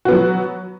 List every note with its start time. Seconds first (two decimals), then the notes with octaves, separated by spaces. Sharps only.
0.05 F#4
0.08 B3
0.12 F#3